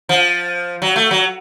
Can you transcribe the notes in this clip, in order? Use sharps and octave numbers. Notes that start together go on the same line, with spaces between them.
F3
F#3
A3
F#3